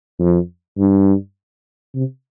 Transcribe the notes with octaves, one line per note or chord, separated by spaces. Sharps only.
F2
G2
C3